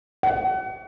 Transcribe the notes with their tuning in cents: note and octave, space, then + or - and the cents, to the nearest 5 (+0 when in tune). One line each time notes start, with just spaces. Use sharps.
F#5 +35